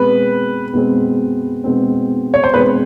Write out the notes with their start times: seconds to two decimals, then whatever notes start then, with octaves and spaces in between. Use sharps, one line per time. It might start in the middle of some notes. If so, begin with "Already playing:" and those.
Already playing: B2 G#3 C4 B4
0.73 B2 G#3 C4
1.64 B2 G#3 C4
2.34 C#5
2.44 C5
2.53 B2 G#3 C4 B4